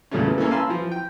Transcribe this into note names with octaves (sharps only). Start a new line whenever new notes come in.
E2 A#2 C#3 G3 A3 C#4
E3 E4
A#3 C#4 E4 A4
F5 G#5 A5 B5 C6 E6
E3 F3
G5